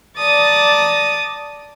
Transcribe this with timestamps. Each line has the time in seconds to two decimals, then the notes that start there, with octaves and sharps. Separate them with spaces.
0.18 D5 A5 A#5 D6 D#6 A6